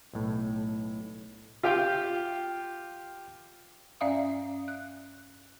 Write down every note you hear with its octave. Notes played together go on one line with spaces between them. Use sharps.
B1 A2
F4 G4 F5 G5
G2 C#4 D5 E5 F5 D#6
F#6